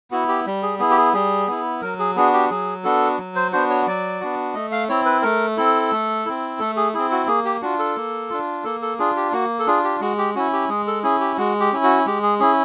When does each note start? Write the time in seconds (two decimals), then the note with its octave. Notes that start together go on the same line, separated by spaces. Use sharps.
0.11 B3 E4 F#4
0.28 G4
0.46 G3
0.63 G#4
0.79 B3 E4 G#4
0.90 G4
0.97 G#4
1.14 G3 G#4
1.47 B3 E4
1.82 F#3 A#4
1.99 G#4
2.16 B3 D4 F#4 G#4
2.34 G4
2.50 F#3 G#4
2.84 B3 D4 F#4 A4
3.18 F#3
3.36 C5
3.52 B3 D4 F#4 C5
3.70 C#5
3.87 F#3 D5
4.21 B3 D4 F#4
4.54 A3 D#5
4.72 F5
4.89 C4 E4 C#5
5.06 B4
5.23 A3 A#4
5.57 C4 E4 A4
5.92 A3
6.26 C4 E4
6.59 A3 A4
6.77 G#4
6.94 C4 E4 G#4
7.12 F#4
7.27 A#3 G#4
7.45 G4
7.62 D4 F4 F#4
7.79 A4
7.96 A#3
8.30 D4 F4
8.64 A#3 A4
8.82 A4
8.99 D4 F4 G#4
9.16 G4
9.32 A#3 F#4
9.59 A4
9.67 D4 F4 G#4
9.84 G4
10.01 G#3 F#4
10.18 G4
10.35 C#4 E4 F#4
10.53 G4
10.69 G#3 G#4
10.87 A4
11.03 C#4 E4 G#4
11.20 G4
11.37 G#3 F#4
11.60 G4
11.72 C#4 E4
11.83 F#4
12.06 G#3 G4
12.23 G#4
12.40 C#4 E4 G#4